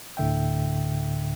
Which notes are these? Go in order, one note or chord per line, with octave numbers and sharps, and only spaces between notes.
D2 A2 D3 E5 G5